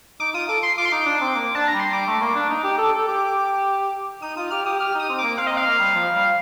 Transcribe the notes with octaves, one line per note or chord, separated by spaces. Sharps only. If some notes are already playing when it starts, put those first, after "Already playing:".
D#4 D6
F4 D#6
A4 D6
C6
F4 D6
C6
D#4 D6
D4
C4
A#3
D4 A5
A#5
G3
C6
G3 D6
A3
A#3
D4
D#4
G4
A4
A4
G4
D#4 D#6
F4 D#6
G4 F6
G4 D#6
G4 F6
D#4 D#6
C4
A#3 D6
C4 F5
D#5
C4 F5
A#3
G3
F3
G3